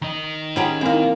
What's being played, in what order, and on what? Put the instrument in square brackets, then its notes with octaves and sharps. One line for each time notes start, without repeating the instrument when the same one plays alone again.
[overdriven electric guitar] D#3 D#5
[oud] C#4 G4 G#4 [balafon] F4 F#5 A#5
[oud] A#3 A#4 [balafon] C4 D#4 E4